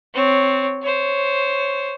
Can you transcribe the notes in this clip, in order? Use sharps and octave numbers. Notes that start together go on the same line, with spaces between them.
C4 C#5
C5 C#5